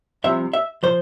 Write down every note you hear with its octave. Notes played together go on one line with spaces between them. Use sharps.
C2 C3 F3 E5
E5
C3 F3 C5